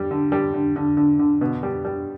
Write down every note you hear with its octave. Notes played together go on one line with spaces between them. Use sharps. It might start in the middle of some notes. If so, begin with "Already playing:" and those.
Already playing: G3
D3
G3
D3
D3
D3
D3
B2
G3
G3